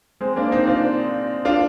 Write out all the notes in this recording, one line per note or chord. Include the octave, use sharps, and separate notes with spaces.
G#3 C4
A#3 D4
C4 D#4
D4 F4
D4 F4